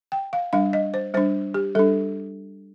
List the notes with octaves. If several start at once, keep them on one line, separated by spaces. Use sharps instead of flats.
G5
F5
G3 D4 F5
D#5
C5
G3 D4 C5
G4
G3 D4 A4